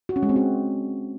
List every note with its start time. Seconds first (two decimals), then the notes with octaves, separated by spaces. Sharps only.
0.09 F#4
0.16 C#4
0.23 G#3
0.29 C4
0.36 F#4